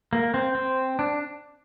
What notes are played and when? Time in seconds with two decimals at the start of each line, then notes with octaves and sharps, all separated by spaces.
0.13 A#3
0.34 C4
0.55 C4
0.99 D4